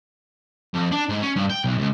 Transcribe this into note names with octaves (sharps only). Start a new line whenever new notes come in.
F2
D4
G#2
C#4
G2
G5
B1
C#2